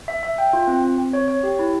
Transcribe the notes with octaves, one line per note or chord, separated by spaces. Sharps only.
E5
E5
G5
F4
C4
C4
C4
C#5
C#5
G4
E4